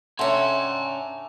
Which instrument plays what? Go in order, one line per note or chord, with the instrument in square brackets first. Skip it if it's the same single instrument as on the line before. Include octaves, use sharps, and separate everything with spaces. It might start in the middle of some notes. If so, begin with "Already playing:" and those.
[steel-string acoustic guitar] C3 C#4 [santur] A3 D4 [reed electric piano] F#5 C6 [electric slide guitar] G#5 A#5